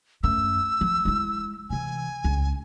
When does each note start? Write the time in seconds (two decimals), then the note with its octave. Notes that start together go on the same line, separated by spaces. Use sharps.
0.23 F#2 A3 E6
0.81 F3
1.05 G#3 E4
1.70 C3 E3 G#5
2.24 C#2